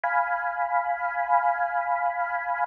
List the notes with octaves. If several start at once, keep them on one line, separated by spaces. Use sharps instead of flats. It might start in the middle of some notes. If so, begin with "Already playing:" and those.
F5 G#5 B5